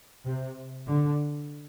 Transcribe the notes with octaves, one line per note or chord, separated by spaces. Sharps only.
C3
D3